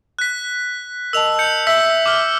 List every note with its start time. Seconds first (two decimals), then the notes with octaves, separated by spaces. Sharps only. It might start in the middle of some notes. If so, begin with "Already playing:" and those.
0.19 F#6 B6
1.13 A#4 D#5 A5 E6 F7
1.39 G6 C#7
1.67 E5 E6 B6
2.06 D6 F6